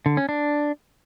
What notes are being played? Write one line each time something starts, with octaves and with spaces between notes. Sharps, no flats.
D3
C#4
D4